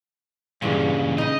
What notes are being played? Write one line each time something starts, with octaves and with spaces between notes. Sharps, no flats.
G2 A#2 C#3 E3 G#3
C#3 D#4 D#5